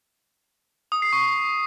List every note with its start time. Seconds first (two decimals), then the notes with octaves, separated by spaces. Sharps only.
0.92 D#6
1.02 C7
1.13 C#6